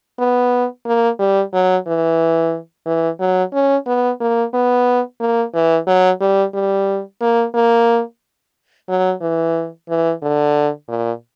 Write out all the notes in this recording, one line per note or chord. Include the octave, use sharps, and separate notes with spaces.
B3
A#3
G3
F#3
E3
E3
F#3
C#4
B3
A#3
B3
A#3
E3
F#3
G3
G3
A#3
A#3
F#3
E3
E3
D3
A#2